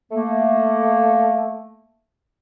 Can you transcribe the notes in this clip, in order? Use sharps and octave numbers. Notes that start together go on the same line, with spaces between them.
A3 A#3